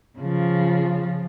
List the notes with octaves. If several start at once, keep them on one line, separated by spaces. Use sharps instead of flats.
C#3 F3